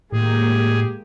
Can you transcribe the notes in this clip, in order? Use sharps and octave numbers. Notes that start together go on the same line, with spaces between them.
A2 D#3 G#3 A#3 G4 G#4